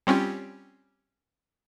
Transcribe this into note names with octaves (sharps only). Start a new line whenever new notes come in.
G3 C4 C#4 F4 G4